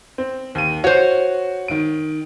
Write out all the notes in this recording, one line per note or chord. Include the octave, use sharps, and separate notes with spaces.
C4
D#2 D#7
F#4 C5 C#5
D#3 D7